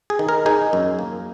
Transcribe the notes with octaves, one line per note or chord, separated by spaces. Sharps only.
G#4
D#3
A#4
D#4 G#4
F#2
A#3